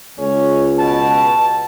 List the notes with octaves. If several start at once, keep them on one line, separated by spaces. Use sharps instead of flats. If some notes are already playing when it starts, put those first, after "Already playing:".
C#2 C#4
B2 A5